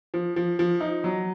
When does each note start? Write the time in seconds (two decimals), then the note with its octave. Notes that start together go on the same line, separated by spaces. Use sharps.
0.14 F3
0.36 F3
0.59 F3
0.80 D#4
1.04 F#3